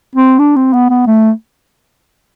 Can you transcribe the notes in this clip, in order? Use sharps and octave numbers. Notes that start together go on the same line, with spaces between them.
C4
D4
C4
B3
B3
A3